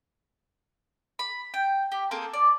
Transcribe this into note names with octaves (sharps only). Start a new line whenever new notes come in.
B5
G5
G4
A#3 C4 G#4 A4
D5